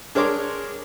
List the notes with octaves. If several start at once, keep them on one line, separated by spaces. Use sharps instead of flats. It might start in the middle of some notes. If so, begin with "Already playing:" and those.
D4 G#4 A#4 C#5 C6 D6